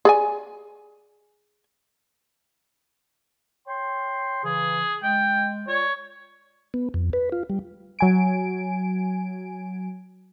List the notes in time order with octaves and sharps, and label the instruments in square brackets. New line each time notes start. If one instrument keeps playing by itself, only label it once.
[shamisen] G#4 D5 G#5
[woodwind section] C#5 G5 C6
[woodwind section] C#3 E3 [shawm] G#4
[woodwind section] G#3 [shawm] G5
[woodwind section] F4 D5 [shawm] C#5
[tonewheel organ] B3
F2
B4
F4
G3
[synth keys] F#3 G#5 D7